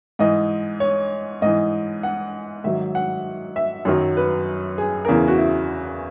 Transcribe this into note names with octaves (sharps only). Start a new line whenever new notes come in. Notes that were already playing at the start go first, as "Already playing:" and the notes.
G#2 E3 D#5
C#5
G#2 E3 D#5
F#5
G#2 D#3 F#3 E5
F#5
E5
F#2 D#3 F#3
B4
G#4
E2 C#3 E3 A#4
G#4
F#4
E4